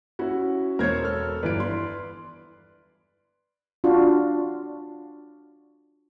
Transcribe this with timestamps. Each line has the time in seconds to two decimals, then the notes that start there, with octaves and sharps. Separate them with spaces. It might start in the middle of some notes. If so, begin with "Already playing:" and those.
0.19 C#4 E4 F#4
0.79 E1 A#4 C5 C#5 G#6
1.03 A4 F6
1.43 G1 E3 B4 D5 D7
1.60 C6
3.84 D4 F4 F#4